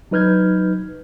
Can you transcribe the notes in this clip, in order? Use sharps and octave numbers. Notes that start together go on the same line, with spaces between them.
F#3 D#4 B4 F6 G6 G#6